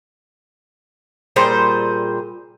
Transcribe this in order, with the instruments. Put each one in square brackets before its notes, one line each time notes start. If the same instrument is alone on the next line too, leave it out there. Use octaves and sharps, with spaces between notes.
[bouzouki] A#2 G3 G#4 C5